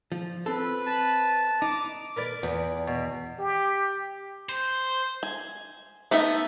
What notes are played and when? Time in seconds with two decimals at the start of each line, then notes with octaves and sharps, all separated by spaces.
0.12 F3
0.46 C4 A4 B4
0.86 A5
1.62 D#4 D6
2.16 A#4 B4 D5
2.43 E2
2.88 B2
3.39 G4
4.49 C5
5.23 G#5
6.11 A3 B3 D#4 E5